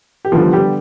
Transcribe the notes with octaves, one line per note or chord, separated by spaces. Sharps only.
G4
D3 F3 G3 B3 F4
G3 G4